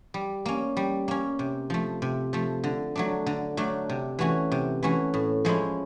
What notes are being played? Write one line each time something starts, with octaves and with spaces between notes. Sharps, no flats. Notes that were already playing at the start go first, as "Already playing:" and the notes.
G3
A#3 C#4
G3
A#3 C#4
C3
F3 A3
C3
F3 A3
D3
F#3 A3 D4
D3
F#3 A3 D4
C3
E3 A3 C#4 F#4
C3
E3 A3 C#4 F#4
A2
F3 G#3 C#4 E4